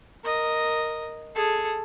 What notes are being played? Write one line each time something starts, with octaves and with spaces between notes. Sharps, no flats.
A#4 D#5
G#4 A4